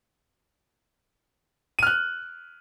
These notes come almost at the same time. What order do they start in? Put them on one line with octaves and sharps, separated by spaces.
D#7 F6 F#6